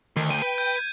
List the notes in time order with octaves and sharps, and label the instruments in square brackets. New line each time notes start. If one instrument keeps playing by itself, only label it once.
[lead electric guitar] D2 [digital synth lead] D#3
[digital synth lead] G5 [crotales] D#7
[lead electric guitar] B4
[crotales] G6
[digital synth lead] G#6